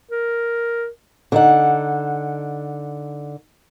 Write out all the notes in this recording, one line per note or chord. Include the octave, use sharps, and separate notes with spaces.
A#4
D3 D#4 F#5